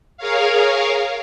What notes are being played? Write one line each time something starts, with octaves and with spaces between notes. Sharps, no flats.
G#4 A#4 C#5 F5